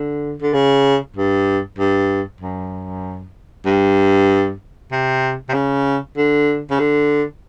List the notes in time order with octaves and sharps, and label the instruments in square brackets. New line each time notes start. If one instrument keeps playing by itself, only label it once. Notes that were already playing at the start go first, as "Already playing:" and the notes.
Already playing: [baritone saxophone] D3
D3
C#3
G2
G2
F#2
G2
C3
C3
C#3
D3
C#3
D3